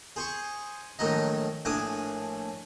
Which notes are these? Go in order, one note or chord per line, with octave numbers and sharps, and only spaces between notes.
G#4 C5 G#5 C#6
A#1 A2 D#3 F#3 D#4 D#5
A#1 A2 D4 G#5 D6 D#6